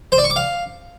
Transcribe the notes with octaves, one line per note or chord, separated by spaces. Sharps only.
C5
D5
C#6
D6
F5